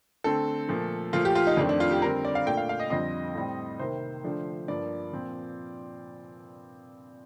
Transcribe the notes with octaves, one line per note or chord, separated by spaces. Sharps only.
D3 A3 C4 A4
A#2 F3 A3
A#2 F3 A3 F4
G4
F4
D#4
F2 D#3 A3 C4 D4
D4
F4
G4
D3 G3 C4 A#4
D5
F5
A#2 A3 D4 G5
F5
F5
D#5
F2 D3 G3 C4 D#5
A2 G3 C4
C3 D#3 A#3 C5
D3 F3 A3 D4
G2 F3 A#3 D5
A#2 F3 C4